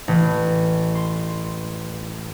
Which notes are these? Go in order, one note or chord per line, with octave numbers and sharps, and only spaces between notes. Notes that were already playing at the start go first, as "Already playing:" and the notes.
A1
C6